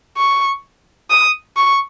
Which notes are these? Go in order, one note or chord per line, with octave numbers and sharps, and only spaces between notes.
C#6
D#6
C#6